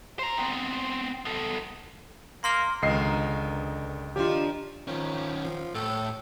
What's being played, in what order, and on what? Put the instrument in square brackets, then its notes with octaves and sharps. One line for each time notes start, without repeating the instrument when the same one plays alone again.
[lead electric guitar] C5 A#5
B3 C4
B3 A4
[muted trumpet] A#3 [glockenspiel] C6 F6 G7
[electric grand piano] C#2 D#5 C7 [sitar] D3 D#3 B3
[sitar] D#3 F3 D4 [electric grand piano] F4 G4
[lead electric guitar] D#3 C#4 [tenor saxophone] F3
[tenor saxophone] F3
[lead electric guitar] A2 [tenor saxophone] A4